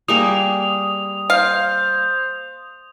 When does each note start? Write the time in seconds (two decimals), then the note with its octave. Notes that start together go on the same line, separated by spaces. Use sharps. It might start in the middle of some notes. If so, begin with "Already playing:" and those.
0.08 G3 A#3 G#4 D#6 F7
1.30 C5 F5